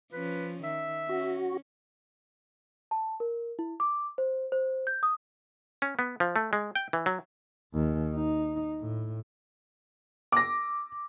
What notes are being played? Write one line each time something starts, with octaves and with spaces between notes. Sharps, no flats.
F3 C#4 B4
D#3 E5
C#4 F#4
A5
A#4
E4
D6
C5
C5
G6
D#6
C#4
B3
F3
A3
G#3
G5
E3
F#3
D#2
D#4
A2
D6 A#6